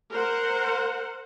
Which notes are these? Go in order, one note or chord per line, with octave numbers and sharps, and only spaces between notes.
A#4 C5 F#5